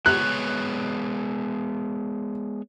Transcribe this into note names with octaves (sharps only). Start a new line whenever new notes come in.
G#3 B3 C#5 F#6